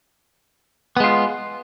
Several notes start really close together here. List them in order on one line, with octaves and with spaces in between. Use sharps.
B3 G#3 F4